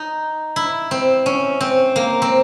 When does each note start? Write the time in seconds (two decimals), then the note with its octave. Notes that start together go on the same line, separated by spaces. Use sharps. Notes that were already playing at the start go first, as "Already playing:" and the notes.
Already playing: D#4
0.56 E4
0.91 C4
1.26 C#4
1.61 C4
1.96 A#3
2.22 C4